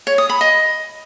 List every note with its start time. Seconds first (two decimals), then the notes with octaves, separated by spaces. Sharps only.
0.07 C#5
0.18 D#6
0.29 B5
0.41 D#5